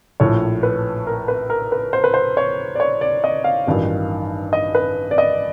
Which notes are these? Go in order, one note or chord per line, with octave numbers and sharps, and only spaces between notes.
A#1 A2 F3 C#5
B4
A#4
B4
A#4
B4
C5
B4
C5
C#5
D5
C#5
D5
D#5
F5
A1 G2 D#3 F#3
D#5
B4
D5
D#5